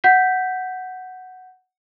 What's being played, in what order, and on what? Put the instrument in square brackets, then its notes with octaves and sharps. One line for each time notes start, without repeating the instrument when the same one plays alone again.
[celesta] F#5 G6 B6